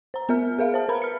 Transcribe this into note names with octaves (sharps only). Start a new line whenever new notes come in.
C5 A#5
B3 A#4 E5 F6
G#4 A#4 E5 F5
C5 A5
A#4 B4 A#5 B5
F6 C#7